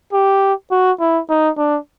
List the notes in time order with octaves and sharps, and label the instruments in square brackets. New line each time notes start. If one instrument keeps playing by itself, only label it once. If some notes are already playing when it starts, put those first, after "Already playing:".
[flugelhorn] G4
F#4
E4
D#4
D4